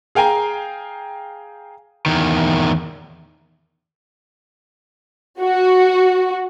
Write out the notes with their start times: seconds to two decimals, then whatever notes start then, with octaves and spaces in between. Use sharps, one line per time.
0.15 G#4 F5 G5 G#5 A#5
2.06 E2 D#3
5.41 F#4